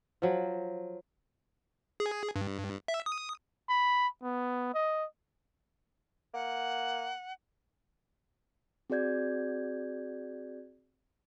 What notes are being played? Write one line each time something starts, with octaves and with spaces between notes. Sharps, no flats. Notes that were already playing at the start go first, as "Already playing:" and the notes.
F3 F#3
G#4
G2
E5
D#6
B5
B3
D#5
A#3 F#5
C4 F#4 G#4 D5 G6 G#6